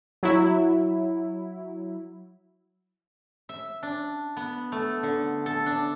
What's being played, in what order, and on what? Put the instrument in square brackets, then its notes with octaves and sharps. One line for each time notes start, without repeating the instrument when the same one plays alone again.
[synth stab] F#3 E4
[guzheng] E5
D4
B3
A3
D3
A4
D4